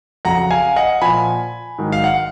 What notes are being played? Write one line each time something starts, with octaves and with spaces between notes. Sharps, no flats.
F2 C#3 F#3 F#5 A#5
F5 G#5
D#5 F#5
A#2 F3 G#5 B5
G#2 D#3 F#3
F5
F#5